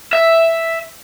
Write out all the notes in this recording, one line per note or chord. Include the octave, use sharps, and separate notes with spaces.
E5